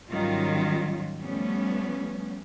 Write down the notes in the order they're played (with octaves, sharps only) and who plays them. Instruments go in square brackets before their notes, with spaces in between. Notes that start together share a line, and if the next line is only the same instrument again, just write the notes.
[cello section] G#2 D#3 F#3 G3 C#4 F4
F3 G3 A3 B3 C#4